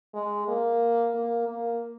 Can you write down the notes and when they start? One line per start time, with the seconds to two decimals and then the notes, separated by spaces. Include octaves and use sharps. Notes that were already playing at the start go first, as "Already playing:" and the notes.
0.13 G#3
0.48 A#3
1.14 A#3
1.47 A#3